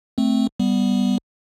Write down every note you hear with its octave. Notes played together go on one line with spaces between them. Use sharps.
A3 C4
G3 B3